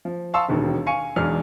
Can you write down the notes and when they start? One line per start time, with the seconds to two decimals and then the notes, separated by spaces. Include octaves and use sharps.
0.05 F3
0.34 F5 A5 C6 C#6 D#6 E6
0.49 E1 D#2 B2 D#3
0.86 F5 G#5 C#6 C#7 D#7
1.16 B1 E2 G#3 D4 G#4 F6